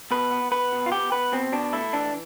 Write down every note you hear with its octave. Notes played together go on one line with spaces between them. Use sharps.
B2 B4
B3
B3 B4
B2
F4
B3 G4
B3 B4
B2 C4
B2 D4
A3 E4
E3 D4